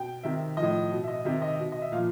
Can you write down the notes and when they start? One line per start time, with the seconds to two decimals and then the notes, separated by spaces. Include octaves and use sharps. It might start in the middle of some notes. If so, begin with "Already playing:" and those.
Already playing: B2 G5
0.23 C3 D#3 E5
0.57 F3 D#5
0.62 A2
0.91 B2
1.04 E5
1.08 D#5
1.25 C3 D#3 E5
1.42 D#5
1.59 B2
1.72 D#5
1.82 E5
1.92 A#2 F3 F5